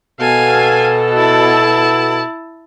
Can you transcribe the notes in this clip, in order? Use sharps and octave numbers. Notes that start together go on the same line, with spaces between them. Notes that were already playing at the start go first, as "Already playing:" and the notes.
B2 A4 F5 G#5
E4 A5